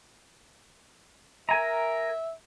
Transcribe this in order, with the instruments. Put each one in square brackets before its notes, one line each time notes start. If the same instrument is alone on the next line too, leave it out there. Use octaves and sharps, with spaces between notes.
[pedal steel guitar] A#4 G#5 A#5 [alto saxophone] E5